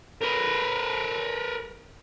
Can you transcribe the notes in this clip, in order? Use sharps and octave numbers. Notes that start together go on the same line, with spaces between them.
A#4 B4